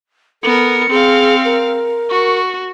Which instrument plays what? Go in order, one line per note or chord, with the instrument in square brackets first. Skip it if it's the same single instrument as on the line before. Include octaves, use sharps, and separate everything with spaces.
[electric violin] B3 A#4 [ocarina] A4 [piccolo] C#7
[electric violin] C4 F5 [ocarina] G#4
[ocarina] A#4
[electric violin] F#4 [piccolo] C#6